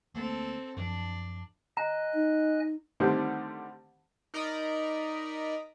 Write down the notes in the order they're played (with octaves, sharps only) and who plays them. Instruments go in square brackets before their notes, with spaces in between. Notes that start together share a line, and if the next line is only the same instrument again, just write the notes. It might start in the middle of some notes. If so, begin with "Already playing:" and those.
[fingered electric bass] D2 A3 A#3 [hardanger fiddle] C4 A4
[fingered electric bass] F#2 F3 [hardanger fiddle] D4
[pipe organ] D#5 G#5 F#6 [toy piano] A#5
[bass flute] D#4
[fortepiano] D3 D#3 G3 A3 C4 D4
[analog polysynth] D#4 A#4 D5 D#5 A#5 B5